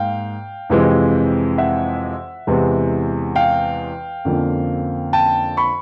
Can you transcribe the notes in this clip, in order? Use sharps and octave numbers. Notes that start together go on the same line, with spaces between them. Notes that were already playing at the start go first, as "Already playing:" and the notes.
Already playing: G#2 A#3 F5 G5
F2 C3 E3 G#3
E5 F#5
E2 C3 E3 G#3
F5 G5
F2 D3 F3 A#3 C#4
G5 A5
B5 C#6